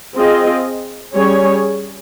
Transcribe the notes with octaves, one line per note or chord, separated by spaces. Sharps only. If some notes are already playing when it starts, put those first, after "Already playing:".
C4 F4 G#4 D#5
G3 C#4 G#4 C#5